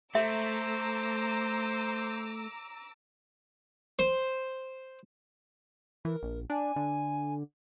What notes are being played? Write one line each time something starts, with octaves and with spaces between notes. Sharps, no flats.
A3 C5 E5 A#5 D6 E6
C5
E3 A#4
A#1
D4 G#5
D3